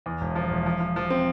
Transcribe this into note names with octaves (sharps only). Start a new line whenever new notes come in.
E2
E1
F3
E1
F3
F3
F3
C4